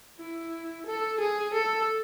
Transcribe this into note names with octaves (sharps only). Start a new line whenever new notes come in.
E4
A4
G#4
A4